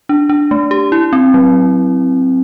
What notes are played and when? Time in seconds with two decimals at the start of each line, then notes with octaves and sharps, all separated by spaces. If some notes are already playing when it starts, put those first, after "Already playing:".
0.09 D4
0.29 D4
0.51 A3
0.71 G4
0.92 E4
1.13 C4
1.34 F#3